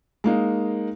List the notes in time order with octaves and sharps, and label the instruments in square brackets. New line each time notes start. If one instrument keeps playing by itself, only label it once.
[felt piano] G#3 A#3 D#4